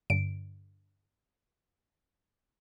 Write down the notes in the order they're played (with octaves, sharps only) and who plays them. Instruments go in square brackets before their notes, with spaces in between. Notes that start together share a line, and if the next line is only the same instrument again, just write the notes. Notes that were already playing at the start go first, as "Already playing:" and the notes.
[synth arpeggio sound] G2 D3 D7